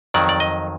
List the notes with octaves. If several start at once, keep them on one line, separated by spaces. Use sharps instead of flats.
F2 D#3 F#3 D5
D5
D#5